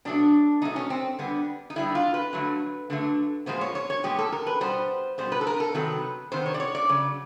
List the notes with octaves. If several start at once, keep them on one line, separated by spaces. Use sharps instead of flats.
B2 F#3 A3 D4
B2 F#3 A3 D#4
C#4
C4
D3 G3 B3
D#4
D3 G3 B3 E4
F4
B4
D3 F#3 A3
D3 F#3 A3
A#2 F3 G#3 B3 C5
C#5
C#5
C#5
A#2 F3 G#3 B3 G4
A4
A#4
B4
B2 G3 B3 C5
B2 G3 B3 C5
B4
A4
A#4
A4
C3 D#3 F#3 B3 B4
C3 D#3 B3 C5
C#5
D5
C#5
D5
C#3 F#3